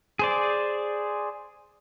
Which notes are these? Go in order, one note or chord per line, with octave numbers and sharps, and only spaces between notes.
G#4 C5 D5